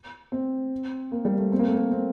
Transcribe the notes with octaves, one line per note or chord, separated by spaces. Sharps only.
C4
A#3
G3
A3
C4
A#3
A3
A#3
C4